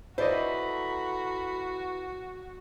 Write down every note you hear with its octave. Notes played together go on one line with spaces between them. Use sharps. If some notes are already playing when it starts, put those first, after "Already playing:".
E4 F#4 A4 B4 C5 D5 D#5 B5